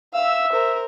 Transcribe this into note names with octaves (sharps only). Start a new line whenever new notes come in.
E5 F5 E6
A#4 C5